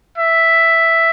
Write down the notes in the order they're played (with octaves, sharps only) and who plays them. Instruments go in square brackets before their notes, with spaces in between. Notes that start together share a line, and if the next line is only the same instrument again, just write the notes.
[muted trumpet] E5